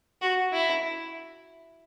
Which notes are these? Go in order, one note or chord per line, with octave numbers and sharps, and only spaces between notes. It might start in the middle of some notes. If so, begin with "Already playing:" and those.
F#4
E4